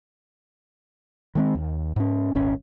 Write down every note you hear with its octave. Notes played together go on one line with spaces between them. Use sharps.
D#3 G#3 C4
D#2
G#2 C#4
D#1 G#1 C#4